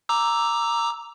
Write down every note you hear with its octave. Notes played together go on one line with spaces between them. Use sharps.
A#5 D6 E6